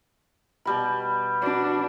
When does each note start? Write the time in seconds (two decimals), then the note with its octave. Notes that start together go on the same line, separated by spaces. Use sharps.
0.65 B2 G3 B5
1.42 D4 F#4 B5 D6